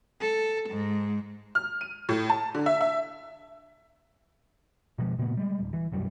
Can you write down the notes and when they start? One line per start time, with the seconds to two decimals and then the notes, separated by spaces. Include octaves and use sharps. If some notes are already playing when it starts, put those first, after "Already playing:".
0.21 A4
0.69 G#2
1.55 F6
1.81 D#7
2.09 A2
2.30 A5
2.54 D3
2.66 E5
2.81 E5
4.98 B2 F3 G#3
5.19 A#2 C#3 A#3 B3
5.37 G3 G#3
5.60 D1
5.73 E3
5.92 B1 F#2 F#3 G3